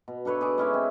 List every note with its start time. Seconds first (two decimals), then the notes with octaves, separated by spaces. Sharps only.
0.08 B2
0.25 D4 A4 B4 C#5
0.41 G#4 C#5 D5
0.58 G#3 C#4 E4
0.74 C4